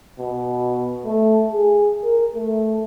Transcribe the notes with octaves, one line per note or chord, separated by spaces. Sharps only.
B2
A3
G#4
A#4
A3